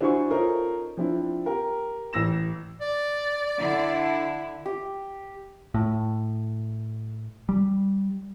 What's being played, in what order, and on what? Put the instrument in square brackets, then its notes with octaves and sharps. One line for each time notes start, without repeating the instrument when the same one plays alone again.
[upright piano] D4 E4 F#4 C5 G#5 C#6
C#4 D#4 F4 A4 A#4 C5
F3 C4 D4 E4
G4 A#4
A1 E6 A#6 E7
[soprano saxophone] D5
[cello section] D3 E4
[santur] G4
[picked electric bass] A2
G3